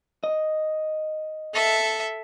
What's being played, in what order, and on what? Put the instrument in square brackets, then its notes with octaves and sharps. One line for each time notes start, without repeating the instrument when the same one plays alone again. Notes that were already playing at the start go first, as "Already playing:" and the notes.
[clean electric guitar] D#5
[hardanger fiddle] A4 E5